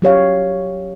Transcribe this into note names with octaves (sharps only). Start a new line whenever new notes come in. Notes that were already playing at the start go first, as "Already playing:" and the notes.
F#3 G4 C#5 F5